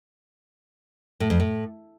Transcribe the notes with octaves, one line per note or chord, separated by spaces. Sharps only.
A2
F2
A2